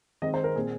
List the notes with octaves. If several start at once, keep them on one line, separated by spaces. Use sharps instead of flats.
D#3 G#3 C4 D#5
C5
A#4
A#2 G#3 C4 G#4